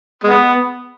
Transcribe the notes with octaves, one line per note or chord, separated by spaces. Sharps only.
G#3 B3